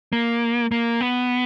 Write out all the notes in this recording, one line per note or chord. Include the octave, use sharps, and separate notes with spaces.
A#3
A#3
B3